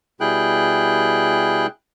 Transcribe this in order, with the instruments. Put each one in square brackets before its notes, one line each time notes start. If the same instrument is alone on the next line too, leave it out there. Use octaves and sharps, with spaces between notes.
[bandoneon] B2 G3 E4 G#4 G5 F#6